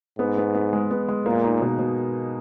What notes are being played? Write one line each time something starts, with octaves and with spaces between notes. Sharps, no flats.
G#2 B3
B3
B3
G#3
B3
G#3
A#2 A#3
D#4
B2
B2